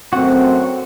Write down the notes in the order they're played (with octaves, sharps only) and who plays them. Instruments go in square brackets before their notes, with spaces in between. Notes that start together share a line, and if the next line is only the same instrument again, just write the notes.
[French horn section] F#2 A3 C4 [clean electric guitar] F#4